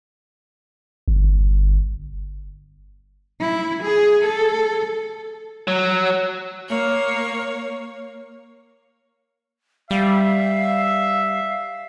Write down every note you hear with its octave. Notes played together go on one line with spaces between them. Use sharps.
G1
E4
G#4
A4
F#3
A#3 C#5
G3 E5 F5